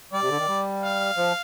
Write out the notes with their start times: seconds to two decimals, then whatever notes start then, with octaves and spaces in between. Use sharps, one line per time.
0.13 G3 D5
0.22 C3
0.30 D3
0.39 D#3
0.48 G3
0.82 F5
1.17 F3